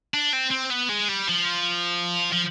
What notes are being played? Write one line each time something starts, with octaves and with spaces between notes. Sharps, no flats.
D4
C4
C4
B3
G#3
G3
F3
F3